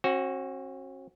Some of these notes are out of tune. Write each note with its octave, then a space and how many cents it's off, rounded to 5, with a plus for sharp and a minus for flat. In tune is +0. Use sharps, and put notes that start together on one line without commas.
C4 +45 F#4 +0